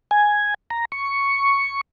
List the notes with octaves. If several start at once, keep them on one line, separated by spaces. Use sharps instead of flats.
G#5
A#5
C#6